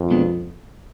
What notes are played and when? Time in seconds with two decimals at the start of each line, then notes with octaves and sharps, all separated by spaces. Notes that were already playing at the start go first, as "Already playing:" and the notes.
Already playing: F2
0.10 B2 G#3 B3 D4